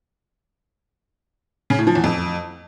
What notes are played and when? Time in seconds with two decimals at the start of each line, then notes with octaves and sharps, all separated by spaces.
1.70 C#3
1.78 A2
1.87 F3
1.95 E2
2.04 F2